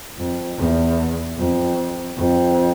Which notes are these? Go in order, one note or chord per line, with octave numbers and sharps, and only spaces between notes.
F2
E2
F2
F2